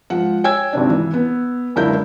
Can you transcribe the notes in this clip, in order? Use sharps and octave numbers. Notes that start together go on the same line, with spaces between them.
G#2 F3 F#5
C#5 G5 G#5 E6 G#6
G#1 C3 D4
E3
B3
F#1 C#2 D3 E4 A#4 G6